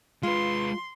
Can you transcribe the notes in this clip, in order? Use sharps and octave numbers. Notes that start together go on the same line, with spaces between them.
G#3 F4 B4 C6